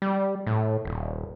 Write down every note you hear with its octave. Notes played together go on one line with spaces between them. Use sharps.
G3
A2
D#1